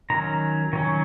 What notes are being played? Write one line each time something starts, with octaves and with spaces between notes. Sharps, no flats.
D#3 F#3 C#4 A#5
D#3 F#3 C#4